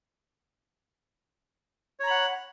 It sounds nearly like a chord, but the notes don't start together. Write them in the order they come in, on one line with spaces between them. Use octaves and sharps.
C#5 A#5 B5 F#5